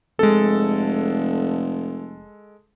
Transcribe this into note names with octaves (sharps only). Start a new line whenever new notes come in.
F1 G#3 A4